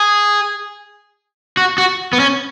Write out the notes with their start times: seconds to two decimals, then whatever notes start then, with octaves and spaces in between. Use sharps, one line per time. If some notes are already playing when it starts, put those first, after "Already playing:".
Already playing: G#4
1.57 F#4
1.78 F#4
2.13 B3
2.20 C#4